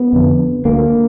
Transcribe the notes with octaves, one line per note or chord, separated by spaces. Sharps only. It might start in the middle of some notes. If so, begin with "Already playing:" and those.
Already playing: B3
F2 D3
D2 D3 A#3